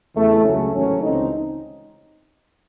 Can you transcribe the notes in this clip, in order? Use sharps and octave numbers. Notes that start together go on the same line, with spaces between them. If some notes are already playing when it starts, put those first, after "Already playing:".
E2 C#3 E3 A3
C#2 C#3 F#3 A3 C#4
A1 G#2 D#3 F#3 A3 C#4
C#2 C3 E3 C4 D#4